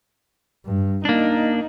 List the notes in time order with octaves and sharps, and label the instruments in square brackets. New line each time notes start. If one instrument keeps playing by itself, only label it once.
[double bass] G2
[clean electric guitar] A#3 D4 [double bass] D#4